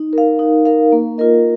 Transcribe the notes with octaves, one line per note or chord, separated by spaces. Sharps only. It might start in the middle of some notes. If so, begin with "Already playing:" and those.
Already playing: D#4
A#4 F5
D#4
A#4 F5
A#3
F4 A#4 D#5